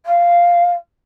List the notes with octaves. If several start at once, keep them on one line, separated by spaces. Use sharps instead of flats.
F5